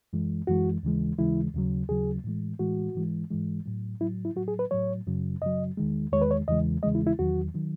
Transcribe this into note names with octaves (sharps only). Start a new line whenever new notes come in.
F#2 E3 G#3
F#2 E3 G#3 F#4
D#2 C#3 E3 G#3
D#2 C#3 E3 G#3 E4
D#2 C#3 F#3
D#2 C#3 F#3 G#4
A2 E3 G#3
A2 E3 G#3 F#4
G#2 E3 G#3
G#2 E3 G#3
A2 F#3
A2 F#3 E4
E4
A2 F#3 F#4
G#4
B4
A2 F#3 C#5
F#2 C#3 F#3
F#2 C#3 F#3 D#5
E2 D#3 G#3
E2 D#3 G#3 C#5
B4
C#5
E2 C#3 E3 G#3 D#5
E2 C#3 E3 G#3 D#5
E4
E4
E2 D#3 F#3 F#4
D#3 F#3